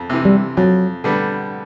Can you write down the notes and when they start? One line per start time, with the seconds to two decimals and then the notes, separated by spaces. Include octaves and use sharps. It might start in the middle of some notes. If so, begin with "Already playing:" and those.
Already playing: F2
0.10 C3 E3
0.25 G3
0.57 F2 F#3
1.04 D3 G3 B3